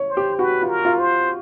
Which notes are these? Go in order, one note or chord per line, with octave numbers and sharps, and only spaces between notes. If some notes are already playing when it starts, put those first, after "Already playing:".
Already playing: C#5
C5
G4
F#4 B4
F4
A#4
F4
C5